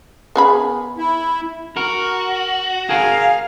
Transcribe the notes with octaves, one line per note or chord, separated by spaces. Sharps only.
B3 G#4 B5
E4
F#4 A#4
G#4 A#4 F5 G#5